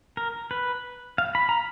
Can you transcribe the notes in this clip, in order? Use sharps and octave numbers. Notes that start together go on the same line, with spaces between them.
A#4
B4
F5
B5
A#5